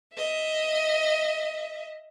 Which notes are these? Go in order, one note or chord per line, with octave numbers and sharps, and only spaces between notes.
D#5 E5